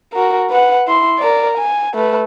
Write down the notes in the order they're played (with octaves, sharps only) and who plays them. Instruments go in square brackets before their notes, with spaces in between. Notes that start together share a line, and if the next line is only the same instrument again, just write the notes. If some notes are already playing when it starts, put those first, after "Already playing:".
[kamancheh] F#4 A#4
B4 F#5
E4 C6
A#4 D5
G#5
A3 B4